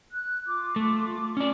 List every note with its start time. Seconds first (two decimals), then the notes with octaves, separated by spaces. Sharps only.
0.10 F#6
0.45 F4 D6
0.76 A3
1.37 C#4 D5